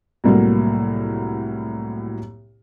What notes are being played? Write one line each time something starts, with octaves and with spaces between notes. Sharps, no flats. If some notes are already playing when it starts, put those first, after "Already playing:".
C2 A2 F#3 A#3